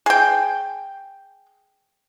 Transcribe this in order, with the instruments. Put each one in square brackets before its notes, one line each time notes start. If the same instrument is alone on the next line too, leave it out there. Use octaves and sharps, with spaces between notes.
[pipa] G#4 G5